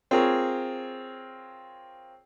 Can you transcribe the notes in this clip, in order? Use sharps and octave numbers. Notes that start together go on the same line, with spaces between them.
C4 F4 G#4 A#4 C#5